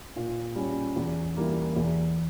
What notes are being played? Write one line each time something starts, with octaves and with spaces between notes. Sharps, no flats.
A#2
G3 C#4
E2
E3 G3 A#3
E2